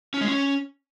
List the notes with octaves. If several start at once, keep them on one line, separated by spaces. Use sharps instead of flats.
C#4
G#3
C#4